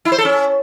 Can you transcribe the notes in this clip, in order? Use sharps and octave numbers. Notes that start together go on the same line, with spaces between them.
E4
C5
A4
C#4